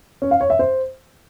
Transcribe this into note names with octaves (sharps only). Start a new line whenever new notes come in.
C#4
F5
C#5
E5
C5